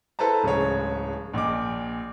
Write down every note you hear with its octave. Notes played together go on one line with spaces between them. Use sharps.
E4 A4 B4 C5 A5 A#5
D1 C#3 G#3 C#5
A#1 A#2 D#5 D6